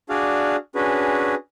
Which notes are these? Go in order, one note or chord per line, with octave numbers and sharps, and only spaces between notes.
D4 F#4 G#4 D5 F5
C#4 D4 F#4 G#4 B4